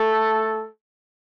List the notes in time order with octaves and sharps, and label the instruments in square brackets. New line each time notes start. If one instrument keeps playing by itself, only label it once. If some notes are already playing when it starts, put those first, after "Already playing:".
Already playing: [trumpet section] A3 A4